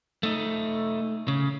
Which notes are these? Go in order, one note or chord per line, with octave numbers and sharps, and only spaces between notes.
A3 D#4
C#3